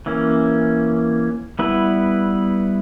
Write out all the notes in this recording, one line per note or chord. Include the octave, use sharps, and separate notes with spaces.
E3 A#3 C#4
G3 B3 E4 B4